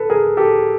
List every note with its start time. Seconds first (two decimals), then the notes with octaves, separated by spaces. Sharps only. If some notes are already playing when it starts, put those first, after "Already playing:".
Already playing: A4 B4
0.10 G#4 A#4
0.37 G4 A4